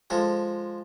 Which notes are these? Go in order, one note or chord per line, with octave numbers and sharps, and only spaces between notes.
F3 G#3 A4